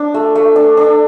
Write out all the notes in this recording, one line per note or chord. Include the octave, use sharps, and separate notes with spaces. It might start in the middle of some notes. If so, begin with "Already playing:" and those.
Already playing: D4
A3
A3
D4
D4